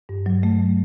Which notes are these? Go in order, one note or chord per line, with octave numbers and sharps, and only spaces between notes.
G2
F#3
A3